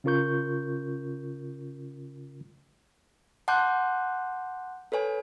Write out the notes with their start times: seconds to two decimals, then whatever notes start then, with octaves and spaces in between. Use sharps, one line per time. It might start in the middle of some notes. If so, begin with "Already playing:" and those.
0.04 C#3 C#4 F4 A#4 C#6 G6
3.48 F#5 A5 C6 D6 F#6 G6
4.92 A4 B4 C#5 G#5